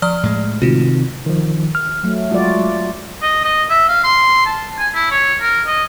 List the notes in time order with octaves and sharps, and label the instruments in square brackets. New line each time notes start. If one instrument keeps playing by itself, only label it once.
[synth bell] F3 D5 F6
[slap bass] A2 G#3
[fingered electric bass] C3 D#3 [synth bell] F4 F#4
[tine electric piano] D#3 F3
F6
[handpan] F#3 A3
[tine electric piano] F#3 G#3 [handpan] F4 F#4 D5
[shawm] D#5
D#5
E5
F5
C6
A5
G#5
E4
C#5
A#4
D#5